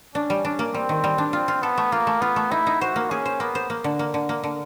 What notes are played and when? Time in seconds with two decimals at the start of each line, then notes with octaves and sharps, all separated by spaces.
0.15 C#4 D4
0.30 G3
0.45 D4
0.59 A#3
0.74 G3 C4
0.89 D#3
1.04 G3
1.18 D4
1.33 C4 F4
1.48 F4
1.62 B3 A4
1.78 A3
1.92 A#3 F4
2.07 A3
2.21 B3 F4
2.36 A3
2.51 D#4 E4
2.67 D#4
2.81 F#4 C5
2.96 A#3
3.11 C#4 G#4
3.26 C5
3.40 A#3 B3
3.55 C5
3.70 A#3
3.84 D3
3.99 A#3
4.14 D3
4.29 A#3
4.44 D3